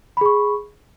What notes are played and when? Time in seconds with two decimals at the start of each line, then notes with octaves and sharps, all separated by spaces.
0.17 B5
0.21 G#4
0.26 C#6